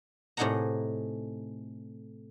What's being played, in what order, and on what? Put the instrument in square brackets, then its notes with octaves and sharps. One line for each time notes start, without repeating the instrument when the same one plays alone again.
[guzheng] A2 C3 D#4 G#4 F#5 A#5